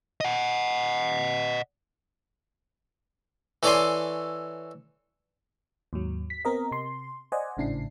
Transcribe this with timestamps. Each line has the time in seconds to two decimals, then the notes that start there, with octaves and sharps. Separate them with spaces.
0.21 D#5 F#5
3.63 E3 A4 C#5 D5 G#5 C6
5.93 D#2 G#2 F#3
6.30 B6
6.45 B3 C4 A#4 D#5
6.71 C3 C6
7.32 C5 D5 D#5 F#5 G#5
7.57 G#1 A2 C#3 D4 E4 C7